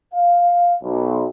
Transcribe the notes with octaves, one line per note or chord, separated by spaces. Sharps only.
F5
B1